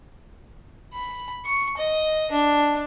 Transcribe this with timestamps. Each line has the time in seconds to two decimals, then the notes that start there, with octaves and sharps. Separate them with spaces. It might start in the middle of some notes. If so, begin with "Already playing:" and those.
0.94 B5
1.45 C#6
1.78 D#5
2.32 D4